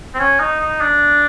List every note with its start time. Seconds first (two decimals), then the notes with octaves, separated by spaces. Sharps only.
0.14 C4
0.19 C#4
0.40 D#4
0.61 D#4
0.81 D4